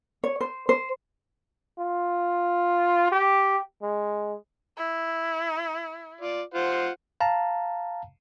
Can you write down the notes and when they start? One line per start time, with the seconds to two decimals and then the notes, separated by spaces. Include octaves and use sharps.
0.24 C#5
0.41 C5
0.69 C5
1.79 F4
3.12 G4
3.83 G#3
4.78 E4
6.21 F4 D5
6.54 F4 C5 F#5
7.20 F5 A5 A#5